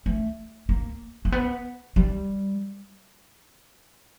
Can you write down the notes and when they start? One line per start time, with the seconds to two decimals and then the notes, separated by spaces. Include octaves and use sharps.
0.06 A3
0.69 A#3
1.25 A#3
1.32 B3
1.96 G3